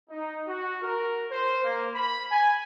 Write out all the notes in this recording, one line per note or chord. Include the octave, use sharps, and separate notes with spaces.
D#4
F#4
A#4
C5
A#3
B5
G#5